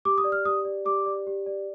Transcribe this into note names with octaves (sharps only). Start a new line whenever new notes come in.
G4 D6
D#6
D5
F6
G4 D#6
D5
G4 D6
D5
G4
D5